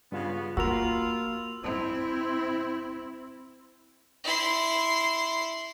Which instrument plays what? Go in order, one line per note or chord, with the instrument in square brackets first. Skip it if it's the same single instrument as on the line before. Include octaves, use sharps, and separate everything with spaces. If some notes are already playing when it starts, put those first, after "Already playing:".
[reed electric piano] G2 F4 [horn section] C#3 B3
[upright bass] A#3 [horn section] F4 [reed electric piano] F#4 A#4 B5 [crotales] E6 F7
[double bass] C4 E4
[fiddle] E4 C6